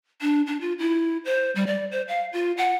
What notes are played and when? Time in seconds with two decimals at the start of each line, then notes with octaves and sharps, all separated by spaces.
0.22 D4
0.47 D4
0.61 F4
0.79 E4
1.25 C5
1.55 G3
1.67 D5
1.92 C5
2.08 F5
2.33 F4
2.57 F#5